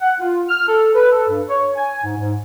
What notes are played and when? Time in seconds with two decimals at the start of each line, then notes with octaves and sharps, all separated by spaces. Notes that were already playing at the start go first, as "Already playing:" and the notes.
0.01 F#5
0.20 F4
0.49 F6
0.68 A4
0.95 B4
1.11 A4
1.29 G2
1.49 C#5
1.76 G#5
2.04 G#2
2.18 G#2